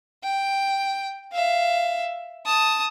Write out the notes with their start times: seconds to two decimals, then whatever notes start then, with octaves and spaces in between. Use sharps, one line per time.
0.24 G5
1.32 E5 F5
2.46 A5 D#6